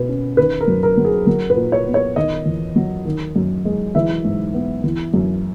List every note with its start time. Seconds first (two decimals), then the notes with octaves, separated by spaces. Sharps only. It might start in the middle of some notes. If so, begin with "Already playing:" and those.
Already playing: B2 B4
0.09 C#4
0.37 D#3 B4
0.61 A#4
0.68 F#2
0.83 A#4
0.97 F#3
1.05 G#4
1.27 F#3 A#4
1.50 B4
1.56 A#2
1.72 C#5
1.86 B3
1.94 C#5
2.16 D#3 D#5
2.46 E2
2.76 F#3
3.05 D#3
3.36 F#2
3.65 G#3
3.95 E3 E5
4.24 G#2
4.54 B3
4.84 E3
5.14 F#2